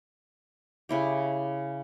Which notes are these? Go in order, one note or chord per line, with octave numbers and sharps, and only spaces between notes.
C#3 E4 G4